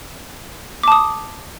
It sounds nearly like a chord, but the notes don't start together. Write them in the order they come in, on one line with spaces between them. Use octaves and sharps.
D6 A5 D#6